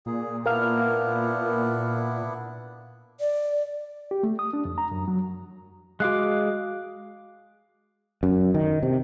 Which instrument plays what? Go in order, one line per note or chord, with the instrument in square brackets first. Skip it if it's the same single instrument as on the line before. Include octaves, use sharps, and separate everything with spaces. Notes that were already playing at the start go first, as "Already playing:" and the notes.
[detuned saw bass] A#2 [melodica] G#4
[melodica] B3 D4 E4 [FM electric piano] A#4 F5 F6
[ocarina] D5
[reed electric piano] G4
A3
D#6
D4
F2
A#5
F#2
F#3
[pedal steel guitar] G#3 F5 D6 [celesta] F#4 F#6
[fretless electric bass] F#2
D#3
C3